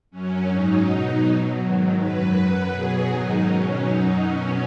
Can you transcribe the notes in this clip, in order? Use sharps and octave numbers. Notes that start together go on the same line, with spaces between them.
F#2 F#3 C#4
G#2 F#3 D#4
B2 F#3
B2 F#3
G#2 D#3 F#3
F#2 F#3 B4
F#2 F#3
B2 F#3 G#4
G#2 D#3 F#3 D#4
B2 F#3 C#4
F#2 F#3 D#4
B2 F#3 C#4